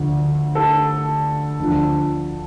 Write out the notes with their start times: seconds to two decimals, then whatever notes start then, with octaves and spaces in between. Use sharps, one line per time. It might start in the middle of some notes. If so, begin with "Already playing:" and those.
Already playing: D2 D3 F3
0.55 A4
1.60 D2 D3 F3